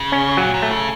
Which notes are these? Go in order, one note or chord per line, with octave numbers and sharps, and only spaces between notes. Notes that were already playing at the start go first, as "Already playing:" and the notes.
Already playing: C#3
C#4
A#2 F#3
A#2
A3
C#3